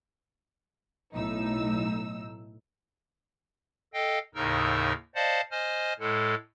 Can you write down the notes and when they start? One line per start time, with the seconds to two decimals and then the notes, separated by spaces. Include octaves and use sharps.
1.13 B1 A2 D#4 E6
3.94 A4 D#5 F5 G5
4.35 D#2 A2 C#3 D#4 A#4 E6
5.15 C5 D5 D#5 F5 F#5 A5
5.51 C5 D#5 G#5 F6
6.00 A2 G#3 A4